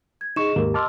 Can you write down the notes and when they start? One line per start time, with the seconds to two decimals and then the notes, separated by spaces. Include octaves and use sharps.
0.21 G#6
0.36 D#4 G#4 D#5 C#6 E7
0.56 D#2 G#2 A#3 G4 A#4
0.74 D#5 A5 C6 D6 E6 F6